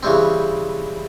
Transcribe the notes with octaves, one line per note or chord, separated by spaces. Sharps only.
C#3 E3 G3 C4